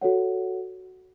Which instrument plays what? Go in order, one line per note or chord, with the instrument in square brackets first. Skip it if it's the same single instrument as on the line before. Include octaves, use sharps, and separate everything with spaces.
[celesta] F#4 A4 C#5 F#5